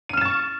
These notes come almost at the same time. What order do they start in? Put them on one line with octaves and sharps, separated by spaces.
D#7 F6 E7 A6 C#6